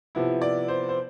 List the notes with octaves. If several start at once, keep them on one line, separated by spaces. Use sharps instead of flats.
C3 F3 B3 E4
D5
C5
C5